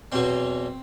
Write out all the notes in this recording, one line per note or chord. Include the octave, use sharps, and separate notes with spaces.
E2 B2 F#3 C4